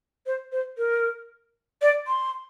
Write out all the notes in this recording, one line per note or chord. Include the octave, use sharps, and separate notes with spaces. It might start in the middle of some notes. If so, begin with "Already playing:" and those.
C5
C5
A#4
D5
C6